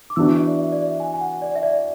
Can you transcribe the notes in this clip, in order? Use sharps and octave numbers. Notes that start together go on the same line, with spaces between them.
D6
E3 B3 D4 F#4 E6
E5
D5
E5
D5
E5
G#5
G#5
F#5
D5
E5
D5